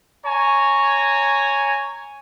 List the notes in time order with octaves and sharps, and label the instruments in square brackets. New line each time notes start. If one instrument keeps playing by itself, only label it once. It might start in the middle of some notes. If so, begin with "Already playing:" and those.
[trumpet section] C#5 G#5 A#5